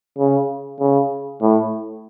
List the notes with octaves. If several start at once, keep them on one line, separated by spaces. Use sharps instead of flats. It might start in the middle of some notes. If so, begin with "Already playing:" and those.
C#3
C#3
A2